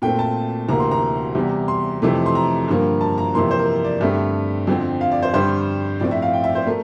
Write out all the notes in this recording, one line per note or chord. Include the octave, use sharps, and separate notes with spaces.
A#2 A3 C4 G5
A5
D2 C3 E3 A#3 A#5
C6
A#5
E2 C3 G3
C6
F2 C3 E3 A3
C6
A#5
G2 D3 F3 A#3
A5
A#5
F2 C3 E3 A#3 C6
C5
A#4
D5
G2 D3 A3 C4 E5
F2 D3 F3 C4
F5
D5
C5
G2 D3 G3 C5
A2 F3 C4 D5
E5
F5
G5
E5
C5
A3 A#4